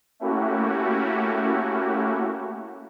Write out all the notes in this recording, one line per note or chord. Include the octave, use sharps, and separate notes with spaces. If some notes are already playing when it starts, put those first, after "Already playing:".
A3 A#3 C#4 E4 F#4 G4